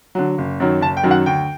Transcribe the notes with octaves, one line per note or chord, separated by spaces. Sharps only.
D3 F#3
F#1
F#2 D#3 F#3
F#1 A5
G5
F#2 D#3 F#3
F#5
D2 G5